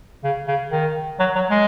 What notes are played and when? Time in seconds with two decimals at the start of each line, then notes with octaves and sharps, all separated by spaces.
0.24 C#3
0.47 C#3
0.71 D#3
1.19 F#3
1.35 F#3
1.50 G#3